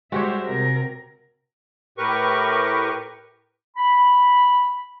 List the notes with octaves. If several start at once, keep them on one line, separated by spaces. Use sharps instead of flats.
G3 G#3 F#4 G4 C5 C#5 E5
C3 A#4
A2 G4 A#4 B4 C#6
B5